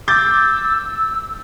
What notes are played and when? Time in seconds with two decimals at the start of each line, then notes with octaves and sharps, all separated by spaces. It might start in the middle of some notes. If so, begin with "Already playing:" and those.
0.08 D6 E6 G6 A6